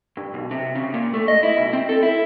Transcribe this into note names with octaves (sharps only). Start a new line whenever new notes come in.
G2
B1
C3
C#3
A#2
A3
D#5
E4
B1
C4
A4
E4